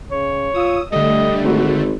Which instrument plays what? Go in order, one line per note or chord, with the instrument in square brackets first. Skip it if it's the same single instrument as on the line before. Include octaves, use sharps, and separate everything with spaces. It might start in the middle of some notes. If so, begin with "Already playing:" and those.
[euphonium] C#3 [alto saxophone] C#5
[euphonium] F4 [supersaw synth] D#6 E6
[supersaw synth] D3 A3 [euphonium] G3 [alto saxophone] D#5
[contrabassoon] G#1 [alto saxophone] F#4